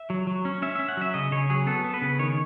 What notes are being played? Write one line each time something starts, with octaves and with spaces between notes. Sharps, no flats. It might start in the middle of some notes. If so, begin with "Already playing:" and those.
Already playing: E5
F#3
F#3
C#4
C#4 E5
C#4 E5
F#5
F#3 E5
C#3 D#5
C#3 C#5
F#3 G#4
B3 A4
B3
B4
C#3
D#3 C#5